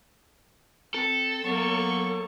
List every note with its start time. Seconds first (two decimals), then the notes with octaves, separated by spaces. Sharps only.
0.94 C4 A4
1.44 F#3 A#3 B3 C#6